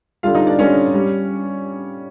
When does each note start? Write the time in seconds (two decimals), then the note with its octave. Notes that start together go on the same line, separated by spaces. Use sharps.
0.23 D3 G3 F4 F5
0.35 D#4 D#5
0.47 D4 D5
0.59 D3 G3 C#4 C#5
0.94 G3